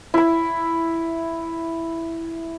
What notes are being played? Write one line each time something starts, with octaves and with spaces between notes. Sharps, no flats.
E4 B5